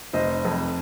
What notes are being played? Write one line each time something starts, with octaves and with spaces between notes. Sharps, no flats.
F1 C5 D#5
F2